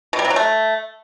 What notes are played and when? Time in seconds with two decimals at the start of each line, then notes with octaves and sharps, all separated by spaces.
0.13 B2
0.19 G3
0.25 C3
0.30 F#3
0.36 A3